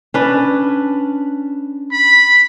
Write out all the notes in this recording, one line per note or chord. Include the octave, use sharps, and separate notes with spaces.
C#4 D4 B4
B5